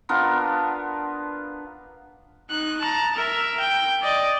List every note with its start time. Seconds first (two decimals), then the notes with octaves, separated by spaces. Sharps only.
0.09 B3 D4 F4 A#4
2.50 D#4 F#6
2.81 A5 A#5
3.16 A#4 E5
3.60 G5
4.03 D5 D#5